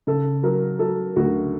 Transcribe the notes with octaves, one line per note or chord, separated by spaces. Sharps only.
C#3 A4
F#3 A#4
F#3 A4
D2 F#4